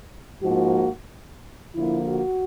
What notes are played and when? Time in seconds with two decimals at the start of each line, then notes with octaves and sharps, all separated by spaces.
0.41 G#2 F3 A#3 F#4
1.73 D3 F3 A#3 E4
2.07 F#4